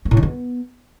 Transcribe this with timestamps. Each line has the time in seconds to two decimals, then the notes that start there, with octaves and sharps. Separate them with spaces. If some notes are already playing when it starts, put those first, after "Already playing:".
0.05 A#3
0.11 A2
0.17 D#3
0.23 B3